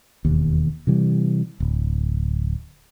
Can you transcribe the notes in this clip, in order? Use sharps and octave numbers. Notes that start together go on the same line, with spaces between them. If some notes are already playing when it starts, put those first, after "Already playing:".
E1 D#2
C3 E3 G3
D1